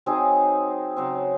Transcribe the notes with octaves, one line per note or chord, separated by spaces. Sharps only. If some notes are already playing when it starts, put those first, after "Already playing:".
F#3 C4 D#4 G#4
C#3 F#3 C4